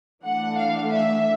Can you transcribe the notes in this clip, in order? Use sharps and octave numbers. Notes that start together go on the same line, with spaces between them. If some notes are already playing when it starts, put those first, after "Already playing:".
E3 A3 D4 F#5
F5
E5